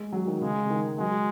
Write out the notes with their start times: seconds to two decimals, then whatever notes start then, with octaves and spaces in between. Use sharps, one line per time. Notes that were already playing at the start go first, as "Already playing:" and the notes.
Already playing: G#3
0.12 F#3
0.27 D#3
0.41 C#3 G#3
0.65 C#3
0.70 D#3
0.98 F#3 G#3